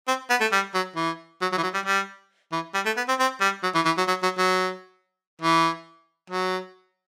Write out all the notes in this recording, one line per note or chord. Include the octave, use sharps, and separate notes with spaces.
C4
B3
A3
G3
F#3
E3
F#3
F#3
E3
F#3
G3
G3
E3
G3
A3
B3
C4
C4
G3
F#3
E3
E3
F#3
F#3
F#3
F#3
E3
F#3